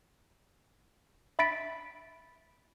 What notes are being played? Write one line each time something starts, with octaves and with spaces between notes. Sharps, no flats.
E5 B5 A6 B6 D7